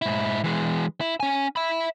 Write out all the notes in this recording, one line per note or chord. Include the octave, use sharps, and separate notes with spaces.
G#2 E4
E3 G#3
E4
C#4 G#5
E5 B5